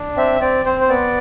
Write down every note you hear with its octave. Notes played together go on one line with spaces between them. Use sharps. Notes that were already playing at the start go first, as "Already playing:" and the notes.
Already playing: D4
C4 E5
C4 D5
C4 C5
C5
B3 D5